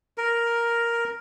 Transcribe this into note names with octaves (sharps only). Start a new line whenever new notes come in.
A#4